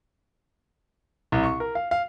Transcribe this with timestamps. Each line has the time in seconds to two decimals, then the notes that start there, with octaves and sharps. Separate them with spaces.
1.32 C2
1.43 C#6
1.60 A#4
1.75 F5
1.91 F5